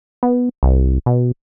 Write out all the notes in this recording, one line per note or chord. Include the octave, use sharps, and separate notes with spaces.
B3
C2
B2